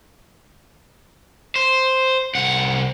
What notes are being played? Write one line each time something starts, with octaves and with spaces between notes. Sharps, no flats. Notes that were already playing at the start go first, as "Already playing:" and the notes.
C5
C2 F#5